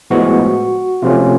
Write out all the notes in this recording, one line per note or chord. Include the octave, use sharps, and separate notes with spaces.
A2 F3 G#3 B3 F#4
C3 F3 A3 C#4 F4